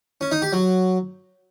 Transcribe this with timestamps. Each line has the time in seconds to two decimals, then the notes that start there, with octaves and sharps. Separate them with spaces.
0.21 C#4
0.32 D#4
0.42 G4
0.53 F#3